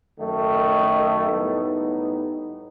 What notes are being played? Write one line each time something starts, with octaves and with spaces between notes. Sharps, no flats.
F#2 D#3 A3
A2 G3 B3 D#4